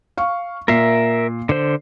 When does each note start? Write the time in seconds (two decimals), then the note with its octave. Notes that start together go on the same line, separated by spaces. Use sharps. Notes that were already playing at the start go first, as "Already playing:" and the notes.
0.17 F5 C#6
0.68 A#2 A#4 E5 C7
1.49 D3 C5